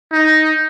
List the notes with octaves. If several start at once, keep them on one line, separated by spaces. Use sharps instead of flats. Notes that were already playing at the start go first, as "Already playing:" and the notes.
D#4